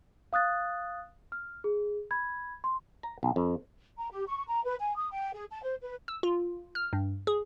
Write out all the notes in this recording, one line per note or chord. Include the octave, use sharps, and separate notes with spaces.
F5 D#6 F#6 A6
F6
G#4
B5 G#6
C6
A#5
B1
F2
A#5
G4
C#6
A#5
B4
G#5
D#6
G5
G#4
A5
C5
B4
E6
F4
F6
G2
G#4